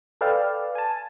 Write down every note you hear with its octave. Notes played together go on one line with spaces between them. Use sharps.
A4 B4 D5 F5 G5 A5
G#5 A5